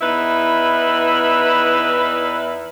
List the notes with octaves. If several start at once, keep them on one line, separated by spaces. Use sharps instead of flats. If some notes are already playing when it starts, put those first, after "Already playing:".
E2 D#4 E4 B4